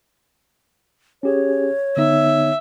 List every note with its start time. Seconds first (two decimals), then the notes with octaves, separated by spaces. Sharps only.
1.23 C#4 G4 G#4 C#5
1.97 D3 B3 D#4 E5